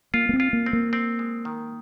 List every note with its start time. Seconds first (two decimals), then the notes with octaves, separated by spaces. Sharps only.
0.14 A#3 F4
0.29 A#3
0.33 C4
0.40 F4
0.53 A#3
0.66 C4
0.73 A#3
0.93 C4
1.19 G#3
1.45 D#3